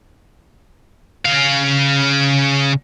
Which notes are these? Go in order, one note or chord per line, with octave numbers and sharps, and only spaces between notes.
C#3 F5